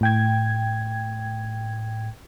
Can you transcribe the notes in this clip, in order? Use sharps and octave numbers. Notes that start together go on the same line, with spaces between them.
A2 G5 G#6